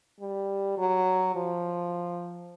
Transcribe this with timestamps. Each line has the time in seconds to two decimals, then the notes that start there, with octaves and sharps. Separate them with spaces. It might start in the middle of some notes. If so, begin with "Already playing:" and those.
0.20 G3
0.78 F#3
1.35 F3